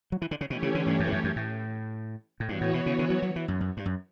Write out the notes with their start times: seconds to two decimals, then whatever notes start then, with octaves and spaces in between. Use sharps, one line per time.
0.12 F#3
0.22 E3
0.31 D3
0.41 C#3
0.50 B2 E3 A3 C#4 G4 C#5
0.63 C#3
0.75 D3
0.87 G2
1.00 F#2
1.08 G2
1.13 F#2
1.24 F#2
1.36 A2
2.40 A2
2.48 G2 E3 B3 F#4 C#5
2.61 A2
2.74 B2
2.86 C#3
2.99 D3
3.10 F#3
3.22 F#3
3.36 E3
3.48 F#2
3.61 F#2
3.77 G2
3.86 F#2